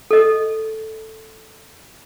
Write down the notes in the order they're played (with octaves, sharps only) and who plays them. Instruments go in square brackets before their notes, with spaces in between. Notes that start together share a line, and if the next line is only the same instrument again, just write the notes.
[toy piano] A4 D#5